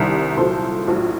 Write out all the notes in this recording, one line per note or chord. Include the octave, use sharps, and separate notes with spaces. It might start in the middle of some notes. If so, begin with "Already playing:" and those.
Already playing: C2 C3 D#3 G3 A#4
C2 A#2 F#3 A4 C5
A#1 A2 F#3